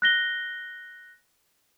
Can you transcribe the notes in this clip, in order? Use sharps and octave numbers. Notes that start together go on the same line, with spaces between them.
F#6 A#6 G7